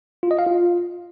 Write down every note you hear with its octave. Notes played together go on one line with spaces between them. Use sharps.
F4
D#5
F5
F4